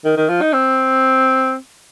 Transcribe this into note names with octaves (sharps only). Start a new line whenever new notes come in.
D#3
D#3
F3
D#4
C4